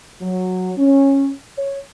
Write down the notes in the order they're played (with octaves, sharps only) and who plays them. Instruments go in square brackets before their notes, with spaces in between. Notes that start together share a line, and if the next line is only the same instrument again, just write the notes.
[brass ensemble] F#3
C#4
C#5